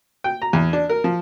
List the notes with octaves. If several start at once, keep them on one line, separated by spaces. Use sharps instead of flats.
G5
A#5
E2
D4
A#4
F3